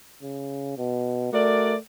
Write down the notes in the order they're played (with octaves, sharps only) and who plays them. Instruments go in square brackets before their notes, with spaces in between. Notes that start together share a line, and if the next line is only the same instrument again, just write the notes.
[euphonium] C#3
B2
[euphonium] A3 [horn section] F#4 A#4 D5